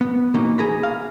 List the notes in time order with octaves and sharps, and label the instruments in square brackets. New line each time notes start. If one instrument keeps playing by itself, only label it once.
[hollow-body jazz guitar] B3
B2 E3 A#3 C#4 D#4
C2 G#4 A#5 B5
F5